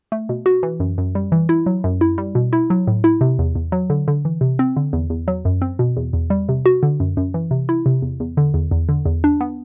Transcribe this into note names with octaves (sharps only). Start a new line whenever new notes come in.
A3
B2
F#4
E3
F#2
F#2
G3
E3
E4
F#3
F#2
E4
G3
B2
E4
F#3
A2
E4
C3
E2
E2
F#3
D3
D3
E3
C3
C4
D3
E2
E2
F#3
F#2
C4
B2
E2
E2
G3
C3
F#4
D3
F#2
F#2
E3
C3
E4
C3
E2
E2
D3
E2
E2
D3
E2
D4
B3